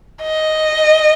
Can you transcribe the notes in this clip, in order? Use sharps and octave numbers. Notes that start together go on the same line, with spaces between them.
D#5